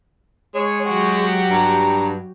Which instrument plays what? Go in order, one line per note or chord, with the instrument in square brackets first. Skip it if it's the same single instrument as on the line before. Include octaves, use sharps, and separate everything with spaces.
[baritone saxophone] G#3 [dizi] C#5
[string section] F#3 F#4 G4 [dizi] C#6
[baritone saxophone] G2 [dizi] A#5